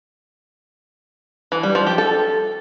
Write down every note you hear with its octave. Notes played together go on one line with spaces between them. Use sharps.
E3
G3
F3
G4
A4